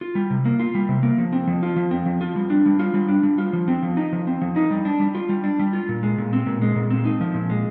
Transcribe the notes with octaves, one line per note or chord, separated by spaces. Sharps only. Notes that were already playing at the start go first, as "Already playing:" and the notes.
F4
G3
C3
A#3
F4
G3
C3
A#3
F3
C4
F3
F4
F3
C4
F3
F4
G3
D4
G3
F4
G3
D4
G3
F4
F3
C4
F3
D#4
F3
C4
F3
D#4
G3
D4
G3
F4
G3
D4
G3
F4
A#2
G#3
A#2
C4
A#2
G#3
A#2
C4
D#4
F3
A#2
G#3